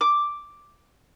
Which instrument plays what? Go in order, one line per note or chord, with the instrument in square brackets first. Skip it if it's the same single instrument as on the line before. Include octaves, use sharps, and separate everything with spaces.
[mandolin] D6